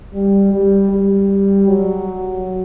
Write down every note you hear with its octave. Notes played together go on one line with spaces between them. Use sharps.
G3
G3
G3
F#3